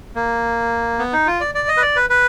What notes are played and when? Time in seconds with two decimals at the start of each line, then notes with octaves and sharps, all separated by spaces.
0.16 A#3
0.99 B3
1.13 D#4
1.27 F4
1.41 D5
1.55 D5
1.68 D#5
1.77 B4
1.82 D5
1.96 B4
2.10 B4